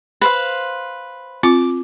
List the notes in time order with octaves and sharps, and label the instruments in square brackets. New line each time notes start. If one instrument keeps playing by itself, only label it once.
[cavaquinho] B4 C5 F5
[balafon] C4 F4 [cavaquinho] D6